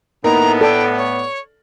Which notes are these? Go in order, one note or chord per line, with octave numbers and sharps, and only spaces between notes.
A2 A#3 B3 D#4 A#4 A#5
A4 D5 G5
C#5